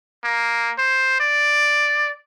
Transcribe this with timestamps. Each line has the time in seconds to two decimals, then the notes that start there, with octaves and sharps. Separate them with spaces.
0.24 A#3
0.78 C5
1.20 D5